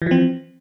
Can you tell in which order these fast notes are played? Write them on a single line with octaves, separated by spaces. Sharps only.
E3 F3 C4